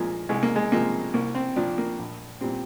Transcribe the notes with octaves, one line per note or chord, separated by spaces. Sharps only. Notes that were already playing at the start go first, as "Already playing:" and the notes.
Already playing: A#2 F3 G#3 A#3
C2 G#3
A#3
G#3
C3 F3 G#3 A#3
C2 A#3
C4
A#2 F3 D4
A#3
A#1
A#2 G3 C4